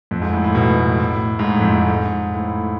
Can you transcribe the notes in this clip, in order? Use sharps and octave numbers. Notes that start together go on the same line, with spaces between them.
F2
G#2
A2
A2
B2
A2
G#2
A2
F2
G#2
G#2
A2